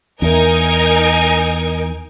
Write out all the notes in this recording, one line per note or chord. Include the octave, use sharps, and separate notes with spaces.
E2 D#4 A#4 G#5